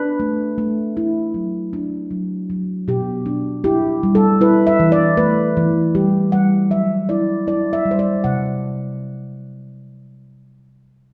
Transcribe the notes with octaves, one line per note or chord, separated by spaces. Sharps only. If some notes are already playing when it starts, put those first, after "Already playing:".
Already playing: D4 B4
A3
A3
E4
F#3
D4
F#3
F#3
B2 G4
D4
E4 G4
G3
A4
E4 B4
E5
E3
D5
A3 B4
E3
G3 G4
G3 F#5
F#3 E5
E4 D5
E4 D5
E5
G3
C5
D5
C3 F#5